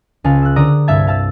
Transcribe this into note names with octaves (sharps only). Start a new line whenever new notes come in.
C#2 G#4 F5 A5
E6 F#6
D3 A#4 D5 A#5 D#6 A#6
C2 G2 E5 F5 A5 G#6
F5 A5 E6